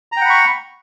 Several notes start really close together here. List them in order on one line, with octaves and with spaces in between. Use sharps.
A#5 G5 F#5 B5 C#6